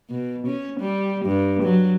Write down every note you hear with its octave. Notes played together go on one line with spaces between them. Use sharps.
B2
C#4
G3
G2
F#3